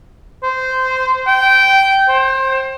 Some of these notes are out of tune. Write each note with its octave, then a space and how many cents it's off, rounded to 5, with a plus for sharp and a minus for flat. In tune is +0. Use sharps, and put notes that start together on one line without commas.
C5 -15
G5 -15
C5 +25